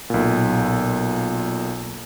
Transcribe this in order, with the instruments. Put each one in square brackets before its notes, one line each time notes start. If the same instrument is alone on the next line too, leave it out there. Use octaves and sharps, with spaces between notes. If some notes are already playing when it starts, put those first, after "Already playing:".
[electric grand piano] B1 A#2